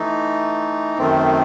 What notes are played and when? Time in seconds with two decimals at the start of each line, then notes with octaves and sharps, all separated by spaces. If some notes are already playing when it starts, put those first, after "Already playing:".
Already playing: E3 A3 D#4
0.98 F#2 D#3 A3 C4